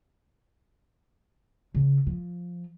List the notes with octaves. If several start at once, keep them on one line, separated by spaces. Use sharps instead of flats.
C#3
F3